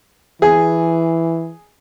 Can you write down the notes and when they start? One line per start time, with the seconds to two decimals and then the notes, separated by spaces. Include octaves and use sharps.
0.42 E3 G#4